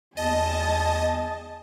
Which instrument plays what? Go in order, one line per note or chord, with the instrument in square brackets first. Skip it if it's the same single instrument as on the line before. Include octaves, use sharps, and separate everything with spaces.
[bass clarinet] E2 [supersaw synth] D#5 [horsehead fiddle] G#5 A5